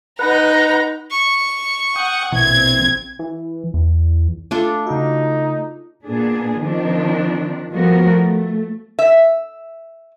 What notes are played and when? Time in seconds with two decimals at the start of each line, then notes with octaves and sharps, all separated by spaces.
0.19 D#4 B4 F#5 A#5
1.11 C#6
1.96 F#5 G5 D#6
2.32 A#1 B2 E3 C4 G#6
3.19 E3
3.74 E2
4.51 A3 D4 F4 A4
4.87 C#3 D#4 F#4
6.05 A#2 B3 D4 G#4
6.60 D#3 F3 C4 D4
7.72 F3 G3 A3 B3 F#4 A#4
8.07 A3
8.99 E5